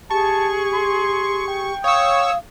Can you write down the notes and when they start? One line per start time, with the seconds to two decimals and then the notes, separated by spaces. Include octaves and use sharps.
0.11 G4 G#4 A5 C#6
0.73 C6
1.48 G5
1.84 C#5 F5 C#6 D#6 E6